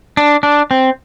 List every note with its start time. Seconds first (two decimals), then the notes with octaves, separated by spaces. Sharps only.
0.17 D4
0.43 D4
0.71 C4